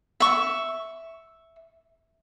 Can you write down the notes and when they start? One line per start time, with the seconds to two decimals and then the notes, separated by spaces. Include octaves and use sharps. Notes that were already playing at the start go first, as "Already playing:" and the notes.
0.20 E5 C#6